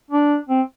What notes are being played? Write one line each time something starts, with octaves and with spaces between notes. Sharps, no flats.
D4
C4